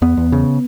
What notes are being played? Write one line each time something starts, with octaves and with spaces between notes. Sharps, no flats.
E2 B3
E2
C#3